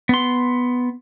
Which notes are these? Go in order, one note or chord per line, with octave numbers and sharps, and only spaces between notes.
B3 C6